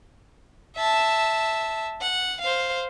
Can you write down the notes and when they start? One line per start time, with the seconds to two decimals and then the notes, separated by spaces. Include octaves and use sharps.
0.76 E5 A5
2.01 F#5
2.42 C5 F5